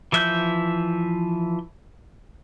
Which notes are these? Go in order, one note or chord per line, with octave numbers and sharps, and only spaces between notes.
E3 F3 E5 F#6 G6